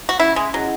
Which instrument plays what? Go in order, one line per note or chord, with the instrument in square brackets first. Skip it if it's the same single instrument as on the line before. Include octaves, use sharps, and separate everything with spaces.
[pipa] F#4
[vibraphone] C#4 [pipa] E4
[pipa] G#3
[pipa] F#3 [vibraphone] E4 G#4 D#5 F#5